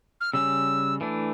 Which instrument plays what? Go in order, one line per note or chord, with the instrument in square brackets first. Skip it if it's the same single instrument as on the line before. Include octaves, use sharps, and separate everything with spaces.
[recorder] F6
[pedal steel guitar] C#3 G3 C#4 [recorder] E6
[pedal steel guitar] E3 A3 D4